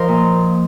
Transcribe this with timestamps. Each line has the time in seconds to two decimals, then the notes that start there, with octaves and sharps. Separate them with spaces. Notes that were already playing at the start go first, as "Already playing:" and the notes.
Already playing: F3 A#4 C5 D#5
0.08 A#2